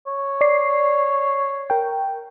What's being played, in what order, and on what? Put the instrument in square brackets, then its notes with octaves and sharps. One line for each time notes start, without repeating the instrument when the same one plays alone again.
[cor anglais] C#5
[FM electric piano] D5 C7
A#4 G5